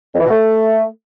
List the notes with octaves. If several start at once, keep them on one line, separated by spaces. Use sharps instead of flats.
F2
E3
B2
A3